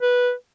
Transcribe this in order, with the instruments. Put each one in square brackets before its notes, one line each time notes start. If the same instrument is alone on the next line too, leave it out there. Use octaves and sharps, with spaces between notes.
[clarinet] B4